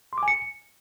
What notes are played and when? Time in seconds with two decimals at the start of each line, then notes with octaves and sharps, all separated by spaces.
0.13 C6
0.18 D6
0.23 G#5
0.28 C#7